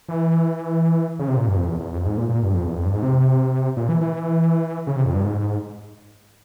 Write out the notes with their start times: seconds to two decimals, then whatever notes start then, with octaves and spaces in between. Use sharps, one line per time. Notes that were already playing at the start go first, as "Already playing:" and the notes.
0.08 E3
1.19 C#3
1.28 C3
1.37 A#2
1.47 G2
1.56 F2
1.68 E2
1.80 E2
1.93 F2
2.05 G#2
2.17 A#2
2.29 A#2
2.42 G2
2.54 F2
2.66 E2
2.76 F2
2.85 G2
2.94 G#2
3.03 C3
3.77 A#2
3.89 E3
4.01 E3
4.87 C#3
4.96 C3
5.06 F2
5.14 G2
5.24 G#2